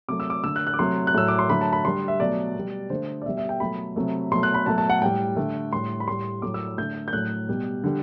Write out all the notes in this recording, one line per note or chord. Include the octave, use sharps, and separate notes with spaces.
C3 F#3 A3 D6
E6
D6
D3 A3 E6
F#6
F#6
D6
C3 F#3 A3 C6
F#6
A2 F#3 A3 E6
D6
C6
D3 F#3 A3 B5
A5
B5
D3 G3 C6
E5
B2 F#3 A3 D5
B2 G3
D3 A3 C5
D5
B2 G3 E5
E5
G5
B2 F#3 A3 B5
C3 F#3 A3
B2 F#3 A3 C6
F#6
B5
B2 F#3 A3 A5
A5
F#5
A2 G3 G5
D3 A3
A2 G3 C6
B5
A2 G3 C6
A2 F#3 A3 D6
E6
D3 A3 G6
G6
A2 F#3 A3 F#6
B2 G3
D3 G3